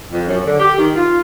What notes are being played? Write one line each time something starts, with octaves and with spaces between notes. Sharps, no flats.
F2
F#2
D3
G4
D#3
F4